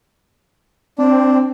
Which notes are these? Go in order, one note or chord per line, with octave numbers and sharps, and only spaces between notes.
C4 D4